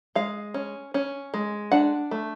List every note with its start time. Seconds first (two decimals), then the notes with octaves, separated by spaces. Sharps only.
0.15 G#3 F5
0.54 C#4
0.94 C#4
1.34 G#3
1.72 D4 F#5
2.11 A3